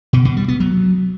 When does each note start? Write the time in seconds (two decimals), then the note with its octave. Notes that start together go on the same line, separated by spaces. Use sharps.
0.13 B2
0.25 B2
0.37 G3
0.48 B3
0.60 F#3